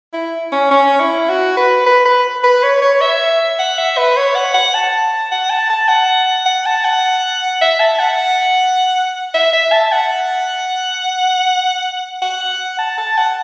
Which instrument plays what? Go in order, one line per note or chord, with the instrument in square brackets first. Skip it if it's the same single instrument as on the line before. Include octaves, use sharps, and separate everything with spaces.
[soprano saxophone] E4
C#4
C#4
E4
F#4
B4
B4
B4
B4
C#5
C#5
E5
F#5
E5
B4
C#5
F#5
F#5
A5
F#5
A5
A5
F#5
F#5
A5
F#5
E5
A5
F#5
E5
E5
A5
F#5
F#5
A5
A5
F#5